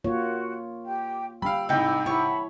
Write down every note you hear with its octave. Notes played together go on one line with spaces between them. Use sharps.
A#3 F4 F#4 C#5
G4 G5
G3 D4 F5 G5 B5 E6
G#2 C3 D#4 E4 D#5 G5 B5
E4 C#5 F#5 A5 B5